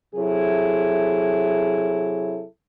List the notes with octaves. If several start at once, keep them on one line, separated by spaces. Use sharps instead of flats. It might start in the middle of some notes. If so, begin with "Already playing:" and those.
C3 F#3 E4 G#4 A4